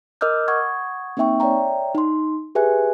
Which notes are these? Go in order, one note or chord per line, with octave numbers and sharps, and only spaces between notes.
A#4 D#5 D6 E6 F6 G6
F#5 C#6 D#6 G#6
A#3 C4 D#4 E5 G5 C#6
C#5 D5 E5 G5 A#5
D#4 C6
G4 G#4 B4 E5 G#5 F#6